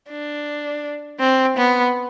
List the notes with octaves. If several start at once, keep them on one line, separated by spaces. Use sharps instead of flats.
D4
C4
B3